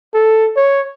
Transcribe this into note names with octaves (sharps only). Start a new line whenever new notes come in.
A4
C#5